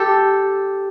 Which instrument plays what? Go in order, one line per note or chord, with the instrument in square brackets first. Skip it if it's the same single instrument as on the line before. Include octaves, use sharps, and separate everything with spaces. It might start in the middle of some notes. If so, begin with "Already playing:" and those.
Already playing: [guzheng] G4 A4